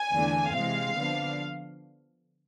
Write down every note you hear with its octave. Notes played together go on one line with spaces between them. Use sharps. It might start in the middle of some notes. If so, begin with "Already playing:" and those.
Already playing: G#5
E2 D3 A3 D4
C3 E3 G#3 C4 F5
D3 F3 B3 D4